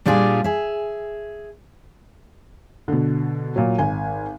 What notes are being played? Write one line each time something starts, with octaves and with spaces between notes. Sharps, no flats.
A#2 G3 D4 F4 G4 G#4
G#4 E5
B2 D3
A#2 F#3
G#1 G#5